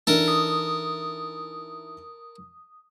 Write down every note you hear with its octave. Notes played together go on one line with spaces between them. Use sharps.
E3 D4 D#4 A4 A#4
D#6